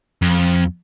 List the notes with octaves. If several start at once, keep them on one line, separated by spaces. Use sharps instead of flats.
F2